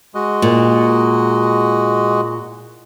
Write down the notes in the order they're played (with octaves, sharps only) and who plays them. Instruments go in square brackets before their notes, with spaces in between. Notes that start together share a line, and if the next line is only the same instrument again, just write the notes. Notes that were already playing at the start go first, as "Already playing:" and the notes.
[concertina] G#3 F#4 D#5
[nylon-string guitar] A#2